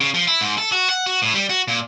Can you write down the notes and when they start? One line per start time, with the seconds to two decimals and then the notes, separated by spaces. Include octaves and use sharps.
0.01 C#3
0.14 F3
0.28 E4
0.41 G#2
0.58 A4
0.72 F#4
0.90 F#5
1.06 F#4
1.22 A2
1.34 G3
1.50 F#4
1.68 A#2